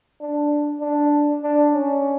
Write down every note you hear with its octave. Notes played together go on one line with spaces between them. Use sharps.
D4
D4
D4
C#4